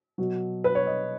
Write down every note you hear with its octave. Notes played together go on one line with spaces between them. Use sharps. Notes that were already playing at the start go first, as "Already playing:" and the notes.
B2 F#3
B4
C#5
D#5